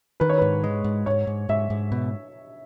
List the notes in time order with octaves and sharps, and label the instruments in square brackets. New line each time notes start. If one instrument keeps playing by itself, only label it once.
[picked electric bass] D#3 [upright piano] B4
[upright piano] C#5
[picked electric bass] G#2 [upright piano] B4
[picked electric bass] G#3
G#2
[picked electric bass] G#2 [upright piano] C#5
[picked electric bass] G#2
[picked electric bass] G#2 [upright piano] E5
[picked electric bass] G#2
B2